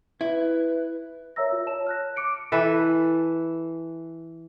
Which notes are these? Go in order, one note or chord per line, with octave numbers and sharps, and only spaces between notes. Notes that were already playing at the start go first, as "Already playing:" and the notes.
E4 B4
A#4 C#5 E5 A#5 E6 A#6
F4
C#5 A5 E7
F6 F#6 A#6
D6 C#7 D7
E3 A4 B4